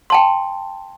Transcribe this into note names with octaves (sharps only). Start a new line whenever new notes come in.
G5 A5 C6